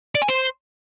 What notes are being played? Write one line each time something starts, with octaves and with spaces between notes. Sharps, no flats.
D5
G#5
C5